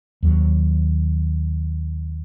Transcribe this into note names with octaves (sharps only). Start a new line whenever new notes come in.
D#2 F#3